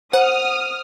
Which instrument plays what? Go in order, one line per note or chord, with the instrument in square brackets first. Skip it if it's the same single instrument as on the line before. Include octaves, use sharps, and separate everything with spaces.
[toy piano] C5 [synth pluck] F#5 [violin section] D#6 F6